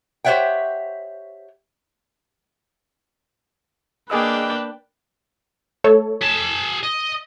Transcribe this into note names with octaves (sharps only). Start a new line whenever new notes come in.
G4 C5 C#5 E5 F#5 G5
A#3 D4 G#4 B4 D#5 G5 E6
A3 A4 C#5
G#4 A5 B6
D#5